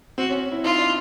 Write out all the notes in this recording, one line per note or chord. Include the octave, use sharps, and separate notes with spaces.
C4 F#4
C#4
C#4
E4
D#4 F4
D4